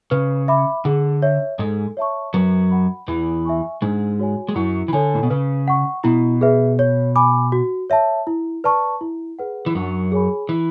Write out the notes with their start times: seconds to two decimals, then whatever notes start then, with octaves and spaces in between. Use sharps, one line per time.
0.11 C#3 B4
0.48 E5 B5 D6
0.85 D3 G#4
1.22 C#5 E5
1.59 G#2 G#3 A4
1.97 C#5 E5 A5 C#6
2.34 F#2 F#3 B4
2.71 F#5 B5
3.08 E2 E3 B4
3.45 E5 G#5 C#6
3.82 G#2 G#3 D4
4.19 F#4 C#5 G#5
4.49 G#3
4.56 F#2 F#3 E4
4.88 E3
4.93 D3 A4 C#5 G#5
5.14 A2
5.23 B2
5.30 C#3 B4
5.68 F#5 C#6
6.04 B2 E4
6.41 G#4 B4 E5
6.79 C#5
7.16 G#5 B5 D6
7.52 F#4
7.90 C#5 E5 A5
8.27 E4
8.64 B4 D5 A5 C#6
9.01 E4
9.39 G#4 B4 F#5
9.66 E3
9.75 F#2 F#3 D4
10.12 G#4 C#5 G#5 B5
10.49 E3 E4